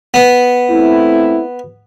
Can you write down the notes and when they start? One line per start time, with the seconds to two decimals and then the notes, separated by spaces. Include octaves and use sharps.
0.14 B3
0.70 A3 C4 E4